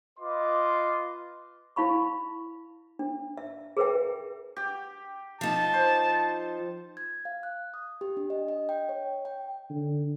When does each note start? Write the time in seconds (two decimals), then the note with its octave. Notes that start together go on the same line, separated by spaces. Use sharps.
0.19 F4 B4 D#5 C6 D6
1.76 E4 F5 B5 C#6
2.99 D4
3.37 E5
3.77 G#4 A#4 B4 E5 G5
4.56 G4
5.41 F3 D#4 A5
5.74 C5
6.97 G#6
7.25 F5
7.43 F#6
7.74 D#6
8.01 G4
8.17 D4
8.30 D#5
8.48 D#5
8.69 G5
8.89 C#5
9.25 G5
9.70 D3